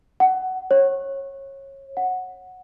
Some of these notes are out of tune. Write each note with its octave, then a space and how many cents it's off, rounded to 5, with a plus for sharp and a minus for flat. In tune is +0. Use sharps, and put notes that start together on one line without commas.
F#5 +15
C#5 -25
F#5 -5